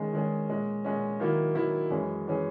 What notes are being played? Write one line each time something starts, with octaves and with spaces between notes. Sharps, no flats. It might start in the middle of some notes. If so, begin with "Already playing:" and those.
Already playing: D#3 G#3 C#4 G#4
D#3 G#3 C#4 G#4
A#2 G#3 C#4
A#2 G#3 C#4
D#3 F#3 A#3 E4
D#3 F#3 A#3 E4
F#2 E3 G#3 C#4 G#4
E3 G#3 C#4 G#4